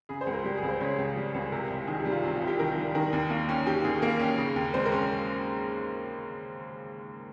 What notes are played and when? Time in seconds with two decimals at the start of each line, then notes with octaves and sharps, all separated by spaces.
0.09 C#3 G#4
0.21 C5
0.27 C#2
0.34 A#4
0.44 G3 G4
0.57 G#4
0.63 C#2
0.68 C5
0.81 C#3 C#5
0.98 C#2
1.16 G3
1.34 C#2
1.52 C3 A#4
1.70 C2
1.87 D#3 G#4
2.00 G4
2.05 G3
2.12 F4
2.23 C3
2.35 F4
2.42 C2
2.47 G4
2.59 D#3 A#4
2.77 G3
2.95 D#3 A#4
3.13 D#2
3.30 A#3
3.49 C#4
3.66 D#3 G4
3.84 D#2 G#4
4.02 A#3 A#4
4.20 C#4
4.38 C#3
4.56 D#2
4.74 G#3 C5
4.86 A#4
4.92 C#4